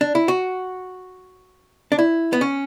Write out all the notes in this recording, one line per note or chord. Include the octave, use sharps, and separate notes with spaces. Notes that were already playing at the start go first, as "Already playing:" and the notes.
D4
E4
F#4
D4
E4
B3
C#4